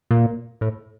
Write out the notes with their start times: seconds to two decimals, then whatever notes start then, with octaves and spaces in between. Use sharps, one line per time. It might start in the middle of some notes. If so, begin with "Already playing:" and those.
0.11 A#2
0.61 A2